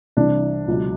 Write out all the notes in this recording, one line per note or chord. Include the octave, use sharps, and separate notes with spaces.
C2 C3 E3 D4
C#2 B2 F#3